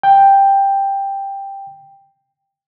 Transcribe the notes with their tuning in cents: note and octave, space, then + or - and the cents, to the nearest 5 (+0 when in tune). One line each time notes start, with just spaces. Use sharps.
G5 +5